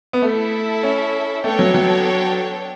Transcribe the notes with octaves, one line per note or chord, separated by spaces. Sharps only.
B3
A3 E4 A4 E5
C#4
A3 B3 D4 A4 C#5 G5
F#3
F#3